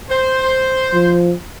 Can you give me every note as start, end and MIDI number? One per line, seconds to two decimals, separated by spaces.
0.10 1.15 72
0.94 1.33 53